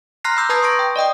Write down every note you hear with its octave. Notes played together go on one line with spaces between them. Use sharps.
A#5 C6 F6 F#6 A#6 C7
B5 D6 E6 G6
B4 A5 A#5 D#6 G#6 C7
C6 C#6 D#6 G6 A#6 D7
G5
D5 D#5 G5 D#6